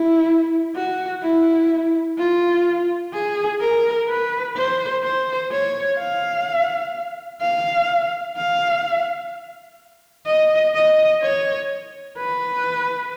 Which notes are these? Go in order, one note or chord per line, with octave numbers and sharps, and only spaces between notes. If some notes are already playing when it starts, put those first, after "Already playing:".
Already playing: E4
F#4
E4
F4
G#4
A#4
B4
C5
C5
C#5
F5
F5
F5
D#5
D#5
C#5
B4